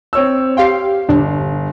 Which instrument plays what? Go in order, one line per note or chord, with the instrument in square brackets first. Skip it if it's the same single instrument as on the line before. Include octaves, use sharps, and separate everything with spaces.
[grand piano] C4 C#5 E6
[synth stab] G4 F5 G5 [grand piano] C6 C7
[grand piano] G1 [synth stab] D4